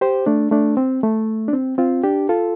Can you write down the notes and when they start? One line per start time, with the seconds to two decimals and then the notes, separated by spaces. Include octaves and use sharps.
0.01 G4 C5
0.26 A3 D4
0.51 A3 D4
0.77 C4
1.03 A3
1.48 D4
1.53 C4
1.78 C4 F4
2.03 D4 G4
2.29 F4 A4